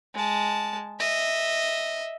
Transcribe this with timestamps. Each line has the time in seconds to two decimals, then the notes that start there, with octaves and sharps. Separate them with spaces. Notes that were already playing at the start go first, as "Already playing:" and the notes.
0.15 G#3 A5
1.00 D#5 E5